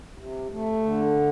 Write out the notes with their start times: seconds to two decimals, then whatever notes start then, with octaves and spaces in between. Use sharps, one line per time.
0.18 C3
0.51 A3
0.84 D3